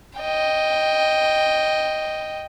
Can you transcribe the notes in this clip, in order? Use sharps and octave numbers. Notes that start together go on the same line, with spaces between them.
D#5 G5